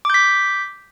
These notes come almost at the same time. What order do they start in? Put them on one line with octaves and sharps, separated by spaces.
D6 G6 B6